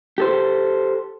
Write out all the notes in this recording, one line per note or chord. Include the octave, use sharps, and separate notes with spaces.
G4 A4 C5